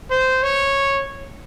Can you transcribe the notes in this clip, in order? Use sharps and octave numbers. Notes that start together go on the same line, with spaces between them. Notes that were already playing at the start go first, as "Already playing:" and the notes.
C5
C#5